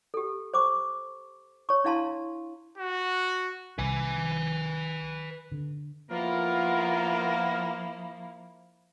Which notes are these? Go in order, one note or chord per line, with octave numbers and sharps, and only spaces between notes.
G4 A4
C5 C#6 D6
C#5 C#6
D4 E4 F5 A5 A#5 C6
F#4
C2 B4 G#5
D3
F3 A#3 B3 E4 F4 A#4